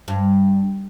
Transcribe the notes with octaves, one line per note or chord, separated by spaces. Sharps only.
G2